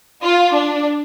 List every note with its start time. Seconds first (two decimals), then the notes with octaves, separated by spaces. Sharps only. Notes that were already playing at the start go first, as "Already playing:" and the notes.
0.23 F4
0.53 D4